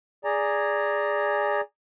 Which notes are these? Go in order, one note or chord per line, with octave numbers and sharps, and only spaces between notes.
G#4 D5 G#5 A#5